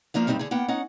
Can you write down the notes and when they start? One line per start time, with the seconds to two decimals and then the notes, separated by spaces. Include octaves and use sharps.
0.14 F2 F3 A#3 D4 F5
0.27 G2 F#3 G3 C4 D#4
0.39 D3 G#4
0.51 A#3 B3 F#5 G5
0.68 C#4 D#4 F#5